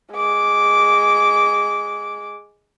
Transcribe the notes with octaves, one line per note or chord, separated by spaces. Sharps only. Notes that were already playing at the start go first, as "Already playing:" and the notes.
G#3 D6